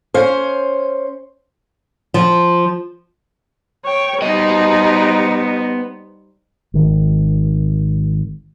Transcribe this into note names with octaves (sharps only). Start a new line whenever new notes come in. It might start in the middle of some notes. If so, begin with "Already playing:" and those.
C#4 C5 F5
F3
C#5 G5
G3 B3 D#4 C5 D#5
G#1 D#3